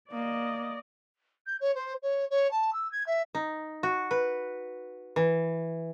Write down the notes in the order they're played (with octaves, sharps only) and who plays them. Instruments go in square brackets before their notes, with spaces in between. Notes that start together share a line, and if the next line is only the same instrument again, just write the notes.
[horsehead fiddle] A#3 [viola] D5 D#5
[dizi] G6
C#5
C5
C#5
C#5
A5
E6
G#6
E5
[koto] D#4
F#4
B4
E3